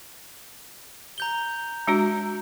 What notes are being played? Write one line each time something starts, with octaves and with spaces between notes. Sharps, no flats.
A#5 G6 G7
G#3 D4 F#4